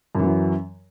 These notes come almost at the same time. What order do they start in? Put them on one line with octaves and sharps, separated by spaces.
F#2 E3 F#3